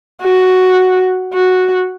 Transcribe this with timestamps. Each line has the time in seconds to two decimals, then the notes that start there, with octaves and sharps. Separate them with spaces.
0.22 F#4
1.34 F#4